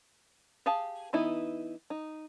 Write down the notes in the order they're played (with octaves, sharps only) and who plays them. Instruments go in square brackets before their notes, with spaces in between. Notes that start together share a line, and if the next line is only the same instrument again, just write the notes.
[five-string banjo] G4 G#4 F5 A5
E3 B3 D#4 E4
D#4